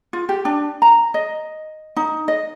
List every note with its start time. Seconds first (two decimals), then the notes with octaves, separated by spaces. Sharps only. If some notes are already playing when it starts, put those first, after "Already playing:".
0.13 F4
0.29 G4
0.45 D4
0.82 A#5
1.14 D#5
1.97 D#4
2.28 D#5